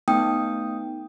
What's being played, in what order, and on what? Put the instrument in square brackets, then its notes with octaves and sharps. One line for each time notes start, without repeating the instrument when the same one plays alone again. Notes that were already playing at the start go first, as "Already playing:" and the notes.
[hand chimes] A3 B3 D#4 G5 D#6